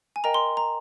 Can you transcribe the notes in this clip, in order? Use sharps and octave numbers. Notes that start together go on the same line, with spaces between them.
G#5
A#4 D#5 G5 A#5
C6
A#5